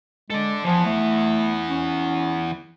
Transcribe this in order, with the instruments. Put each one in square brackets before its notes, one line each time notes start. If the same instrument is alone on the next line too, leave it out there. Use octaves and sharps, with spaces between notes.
[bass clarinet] G#3 [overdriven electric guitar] A4 D5
[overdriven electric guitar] E3 B3 [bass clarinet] F3
[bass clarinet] A3
C#4